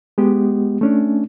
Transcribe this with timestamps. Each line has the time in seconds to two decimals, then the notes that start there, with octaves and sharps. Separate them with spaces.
0.18 G#3 B3 G4
0.81 A3 C#4 D4